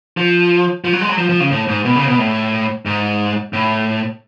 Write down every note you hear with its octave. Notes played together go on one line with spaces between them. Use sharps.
F3
F3
F#3
G#3
F#3
F3
F3
C#3
A2
G#2
B2
C#3
B2
A2
G#2
A2